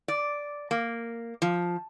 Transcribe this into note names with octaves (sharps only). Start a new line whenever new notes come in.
D5
A#3
F3